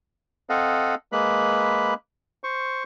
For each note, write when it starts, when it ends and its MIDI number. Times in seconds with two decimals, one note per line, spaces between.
0.50 0.95 60
0.50 0.95 69
0.50 0.95 75
0.50 0.95 77
0.50 0.95 78
1.12 1.94 56
1.12 1.94 58
1.12 1.94 71
1.12 1.94 83
2.44 2.84 72
2.44 2.84 85